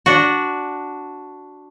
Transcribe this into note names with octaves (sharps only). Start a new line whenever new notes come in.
D4 F#4